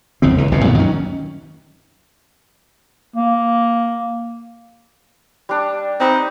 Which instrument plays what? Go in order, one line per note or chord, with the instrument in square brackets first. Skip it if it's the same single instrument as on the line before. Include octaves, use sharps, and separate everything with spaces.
[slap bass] G1 E2 C#3 C4
C#2 E3
G1 C2 G2 B2
F#2 A#2 D#3 B3
D#3 F#3 C#4
[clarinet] A#3
[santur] G3 D4
[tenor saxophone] C4 [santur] D#4 B4